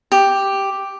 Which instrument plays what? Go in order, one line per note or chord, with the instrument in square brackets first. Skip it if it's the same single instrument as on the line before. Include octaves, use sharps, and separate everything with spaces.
[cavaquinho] G4